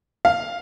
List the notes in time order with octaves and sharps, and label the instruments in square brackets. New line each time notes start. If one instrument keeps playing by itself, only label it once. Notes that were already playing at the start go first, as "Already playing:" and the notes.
[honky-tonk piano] F5